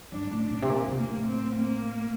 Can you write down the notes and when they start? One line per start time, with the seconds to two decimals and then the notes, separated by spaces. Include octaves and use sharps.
0.12 G2 D4
0.31 A2
0.41 D4
0.50 A#2
0.62 C3
0.69 A#2
0.88 C3
0.98 A#3
1.08 A2
1.27 C4
1.56 A#3